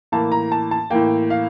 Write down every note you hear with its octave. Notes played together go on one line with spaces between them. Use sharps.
A2 E3 A#3 A5
A#5
A5
A5
A2 E3 A#3 G5
F5